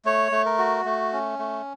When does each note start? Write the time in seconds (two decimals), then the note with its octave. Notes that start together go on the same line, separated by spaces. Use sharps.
0.05 A3 C#5
0.32 A3
0.46 A#4
0.59 F#4
0.85 A3
1.13 C#4
1.39 A3